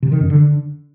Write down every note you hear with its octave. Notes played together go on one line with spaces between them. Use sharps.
C3
D#3
F#2
D3